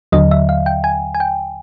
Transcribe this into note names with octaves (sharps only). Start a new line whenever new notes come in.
D#2 D3 F#3 D#5
E5
F5
G5
G#5
G#5
G5